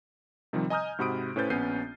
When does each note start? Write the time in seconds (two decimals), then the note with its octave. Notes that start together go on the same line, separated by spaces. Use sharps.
0.53 C3 D#3 F3 G3 C4
0.70 D#5 G#5 A#5 D#6 F6 G6
0.99 G#2 C3 F#4 B5 D#6 D7
1.36 A2 C#4 B4 C5 G6 A6
1.50 A#1 B3 C#4 G6 C7 D#7